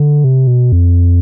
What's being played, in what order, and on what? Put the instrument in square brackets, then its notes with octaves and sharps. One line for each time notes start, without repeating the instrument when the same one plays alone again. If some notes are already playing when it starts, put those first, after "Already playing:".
Already playing: [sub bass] D3
C3
B2
F2